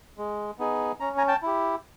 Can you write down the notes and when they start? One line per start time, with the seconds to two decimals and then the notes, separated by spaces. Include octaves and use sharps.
0.18 G#3
0.59 B3 D#4 G#4
1.00 C#4 A#5
1.18 G#5 A#5
1.28 G5 A5
1.42 E4 G4